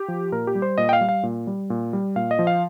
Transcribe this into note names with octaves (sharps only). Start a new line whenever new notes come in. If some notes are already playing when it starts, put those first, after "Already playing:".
Already playing: G4
F3
A#2 A#4
G4
G3
C5
A#2 D#5
G5
F5
G3
F5
A#2
G3
A#2
G3
A#2 F5
D#5
F3
F5